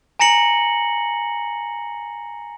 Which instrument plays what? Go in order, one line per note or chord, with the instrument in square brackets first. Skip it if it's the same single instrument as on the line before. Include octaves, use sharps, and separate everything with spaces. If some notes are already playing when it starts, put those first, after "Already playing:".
[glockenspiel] G#5 A#5 A#6 C#7 F#7